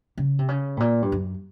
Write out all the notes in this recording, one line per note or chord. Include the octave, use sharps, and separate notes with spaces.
C#3
C3
C#3
A2
A#2
G2
F#2